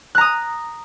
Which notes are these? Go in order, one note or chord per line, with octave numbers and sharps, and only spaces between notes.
A#5 D#6 F#6